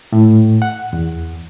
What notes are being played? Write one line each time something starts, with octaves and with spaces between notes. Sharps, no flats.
A2
F#5
E2